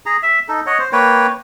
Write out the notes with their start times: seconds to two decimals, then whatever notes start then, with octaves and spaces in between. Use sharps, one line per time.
0.06 G#4 A#5
0.23 E5
0.48 D#4 A4
0.66 C#5 D#5 F#5
0.79 C5
0.92 A#3 B4 C#5 G5